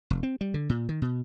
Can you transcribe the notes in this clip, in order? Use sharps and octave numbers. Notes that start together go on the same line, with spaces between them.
F1
C4
G3
D3
A#2
D#3
B2